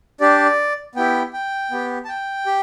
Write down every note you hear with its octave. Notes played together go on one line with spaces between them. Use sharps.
D4 G4 D5
B3 E4 G4 G5
G5
B3 G4
A5
G5
G4